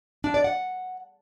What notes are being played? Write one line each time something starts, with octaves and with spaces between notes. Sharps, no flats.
D4
D5
F#5